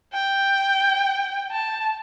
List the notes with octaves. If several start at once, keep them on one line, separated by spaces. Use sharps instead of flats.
G5
A5